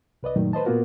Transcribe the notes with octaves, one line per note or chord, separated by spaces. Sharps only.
C2 B4 D5 D#5
F#2 A#2 D#3 F#3 A3 D#4
B4 C5 D#5 A5
A#2 A#3 B3 F4 F#4 A#4